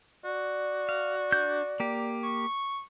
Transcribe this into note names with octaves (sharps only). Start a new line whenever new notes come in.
F#4 D5
F5
D4 G6
A#3 G4
C#6